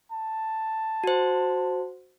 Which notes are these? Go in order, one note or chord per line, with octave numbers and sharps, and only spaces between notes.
A5
F#4 C5